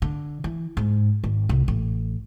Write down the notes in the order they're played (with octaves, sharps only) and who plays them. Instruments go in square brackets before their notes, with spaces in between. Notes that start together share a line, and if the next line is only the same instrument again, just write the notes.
[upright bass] D3
E3
G#2
G#1
C2
A1